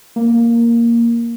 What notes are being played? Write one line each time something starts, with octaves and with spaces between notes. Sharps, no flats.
A#3